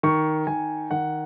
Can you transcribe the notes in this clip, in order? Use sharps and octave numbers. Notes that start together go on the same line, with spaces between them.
D#3 C#6
D#3 G#5
D#3 F#5